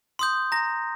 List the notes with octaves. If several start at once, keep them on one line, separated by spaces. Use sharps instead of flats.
C6 D#6 G6
A#5 A#6